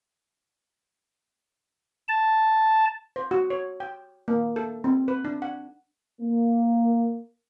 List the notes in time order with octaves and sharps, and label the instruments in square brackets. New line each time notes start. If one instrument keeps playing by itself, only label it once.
[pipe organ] A5
[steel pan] C5
F#4
C#5
G5
A#3
A4
C4
B4
D4
F#5
[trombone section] A#3